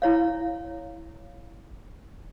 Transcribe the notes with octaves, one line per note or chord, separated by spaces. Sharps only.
E4 C#5 F5